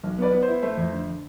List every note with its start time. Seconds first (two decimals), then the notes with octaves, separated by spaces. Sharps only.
0.04 B1
0.18 B3 B4 D5
0.33 B3
0.43 C5
0.48 E4
0.63 A3 C5 E5
0.77 F2
0.92 D3